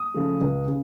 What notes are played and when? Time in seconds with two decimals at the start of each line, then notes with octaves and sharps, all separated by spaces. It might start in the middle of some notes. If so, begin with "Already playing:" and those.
Already playing: D#6
0.14 C#3 F3 A3
0.41 C#2
0.68 C#3